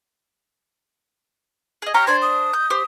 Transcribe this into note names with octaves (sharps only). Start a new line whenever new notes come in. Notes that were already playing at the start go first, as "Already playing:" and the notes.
G#4 D#5
G4 C#5 A#5 F6
D4 C5 G#6
D#6
G6
G4 C5